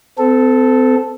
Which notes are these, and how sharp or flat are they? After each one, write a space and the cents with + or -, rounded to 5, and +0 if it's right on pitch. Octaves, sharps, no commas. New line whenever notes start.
C4 -35 A4 +0